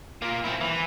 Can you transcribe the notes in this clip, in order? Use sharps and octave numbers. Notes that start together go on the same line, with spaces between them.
A#3 F4
C4 E4
E3